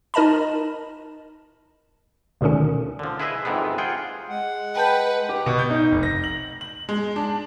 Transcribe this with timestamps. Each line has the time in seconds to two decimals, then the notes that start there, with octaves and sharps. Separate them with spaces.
0.14 D#4 A#4 D#5 A5 B5
2.41 D2 B2 D3 D#3 C#4
2.99 D3 F3
3.20 E4 G#4 B4 D#5 E5
3.45 G1 F2 G#2 C3 B3
3.78 F4 G#4 F#5 G5
4.29 G#3 F#5
4.76 B4 G5 A5 G6
5.29 G4
5.46 B2
5.59 G6
5.70 D#4
5.91 F1
6.03 A#6
6.24 F#7
6.61 F#7
6.89 G#3
7.16 D4